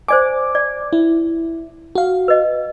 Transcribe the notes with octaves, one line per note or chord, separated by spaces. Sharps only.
C5 D5 G#5 D6
D5
E4
F#4 F5
B4 D#5